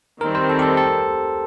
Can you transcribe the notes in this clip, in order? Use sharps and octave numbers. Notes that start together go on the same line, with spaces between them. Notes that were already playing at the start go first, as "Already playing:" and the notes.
D#3 G3 C4 A#4
C5
A4
G4
A4
A4